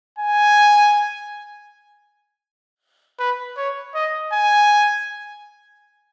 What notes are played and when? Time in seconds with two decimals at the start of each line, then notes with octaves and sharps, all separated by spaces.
0.19 G#5
3.19 B4
3.57 C#5
3.94 D#5
4.33 G#5